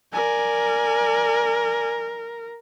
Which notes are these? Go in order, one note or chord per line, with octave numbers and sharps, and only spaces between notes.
A#4 D5 G#5